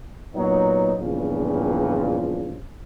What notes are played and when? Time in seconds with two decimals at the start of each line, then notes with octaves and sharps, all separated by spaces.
0.34 A#2 F#3 B3 D#4
0.99 E2 G2 A#2 C#3 F3